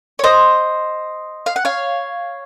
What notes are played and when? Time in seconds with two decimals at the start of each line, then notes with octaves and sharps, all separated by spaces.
0.19 C#5
0.24 C5 D#5
1.46 F5
1.56 F#5
1.65 C#5 F5